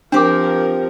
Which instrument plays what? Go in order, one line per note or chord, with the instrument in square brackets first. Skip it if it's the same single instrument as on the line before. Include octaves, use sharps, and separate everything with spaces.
[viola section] F3 A#4 [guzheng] C4 G4 [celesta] D4 D6